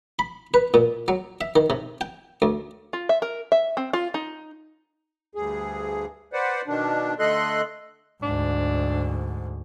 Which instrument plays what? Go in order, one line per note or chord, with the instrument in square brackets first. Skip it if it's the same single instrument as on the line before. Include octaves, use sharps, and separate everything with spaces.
[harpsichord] B5
B4
A#2
F#3
E5
D#3
C3
G5
D2
[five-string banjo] F4
E5
A#4
E5
C4
F4
D#4
[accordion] D2 G2 G#4
B4 C5 D5 F#5
B2 D#3 D4
D3 A3 A4 D#5 C6 F#6
[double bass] D2 G#2 [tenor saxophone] D4